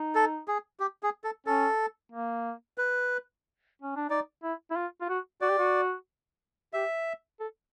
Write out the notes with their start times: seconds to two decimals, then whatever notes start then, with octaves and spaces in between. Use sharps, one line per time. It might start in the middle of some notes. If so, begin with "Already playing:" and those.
Already playing: D#4
0.15 A4
0.48 G#4
0.80 G4
1.03 G#4
1.24 A4
1.47 C#4 A4
2.12 A#3
2.78 B4
3.82 C#4
3.96 D4
4.10 D#4 D5
4.43 E4
4.71 E4
4.77 F4
5.01 F4
5.09 F#4
5.41 F#4 D5
5.50 G4
5.58 F#4
6.73 G4 E5
7.40 A4